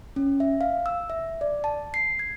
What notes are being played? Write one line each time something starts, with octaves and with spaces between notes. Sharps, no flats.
C#4
E5
F5
E6
E5
D5
A5
C7
G#6